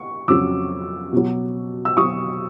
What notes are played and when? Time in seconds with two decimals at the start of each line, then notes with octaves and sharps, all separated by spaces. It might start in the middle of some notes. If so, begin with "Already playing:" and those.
Already playing: C#6
0.28 F2 C#3 F#3 D6 E6
1.13 B2 F#3
1.85 E6
1.97 B2 F#3 C#6 D#6